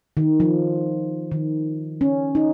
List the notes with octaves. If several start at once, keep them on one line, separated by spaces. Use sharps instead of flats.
D#3
F3
D#3
C#4
D#4